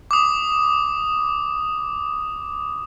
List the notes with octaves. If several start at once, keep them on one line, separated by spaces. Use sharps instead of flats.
D6 D#6